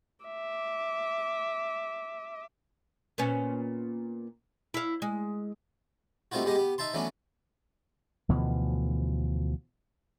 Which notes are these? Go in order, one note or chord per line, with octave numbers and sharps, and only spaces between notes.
E5 D6
A#2 B3 C#4
E4 F5
G#3
G3 A3 C4 D#4 F4 F#4
G3 G#3 B3 G4 D#5
B3 G4
D#4 E5 A5 C6
E3 F#3 A3 B3 C#4 D4
D2 B2 E3 F3